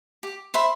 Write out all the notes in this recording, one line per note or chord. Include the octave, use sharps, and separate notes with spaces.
G4
C5 E5 B5